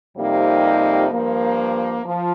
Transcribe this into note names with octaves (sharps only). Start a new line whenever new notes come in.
F2 C3 G3 A#3 D#4
G2 F3 A#3
F3